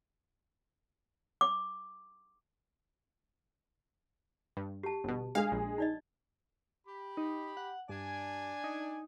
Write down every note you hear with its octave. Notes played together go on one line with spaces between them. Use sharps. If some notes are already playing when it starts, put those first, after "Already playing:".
D6
G2
G4 A5
G1 B2
G#3 D4 G#4 F5
A#1
D#4 D5 D#5
G4 B5
D#4
F#5
G2 D4 D5 G#5
D#4